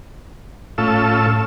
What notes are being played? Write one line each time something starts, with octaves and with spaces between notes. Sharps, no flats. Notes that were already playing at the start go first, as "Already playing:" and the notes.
A2 C#4 F4 A4 E6